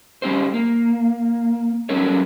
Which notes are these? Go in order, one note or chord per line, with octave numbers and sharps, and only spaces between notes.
G3 C#4 G4 C5
A#3
F#3 G3 C#4 A4 A#4 C#5